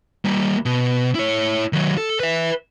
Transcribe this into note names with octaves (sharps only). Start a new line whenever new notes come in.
G3 A#3
B2
E4 C#5
D#3 F#3
A4
B4 E5